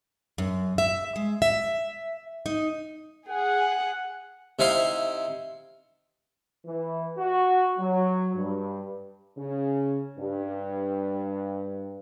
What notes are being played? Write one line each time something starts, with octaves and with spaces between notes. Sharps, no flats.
F#2
E5
G#3
E5
D#4
G#4 F#5
C3 D#4 E4 F5 C6
E3
F#4
F#3
G2
C#3
G2